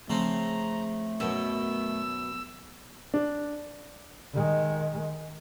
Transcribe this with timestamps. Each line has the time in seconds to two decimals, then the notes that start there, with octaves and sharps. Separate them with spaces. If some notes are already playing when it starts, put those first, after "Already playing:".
0.10 C#3 F3 A3 C4 A#5
1.20 F#2 B2 B3 E6
3.14 D4
4.33 D#3 G#3